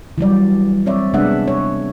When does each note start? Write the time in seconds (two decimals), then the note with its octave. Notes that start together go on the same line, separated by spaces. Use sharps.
0.18 E3 F#3 G3 D5
0.86 C4 C#5 D5 E5
1.14 C3 G#3 B3 D4 E5 F#5
1.48 C#5